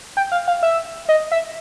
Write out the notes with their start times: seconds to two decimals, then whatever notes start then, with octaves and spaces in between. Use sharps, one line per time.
0.17 G5
0.32 F5
0.48 F5
0.63 E5
1.09 D#5
1.32 E5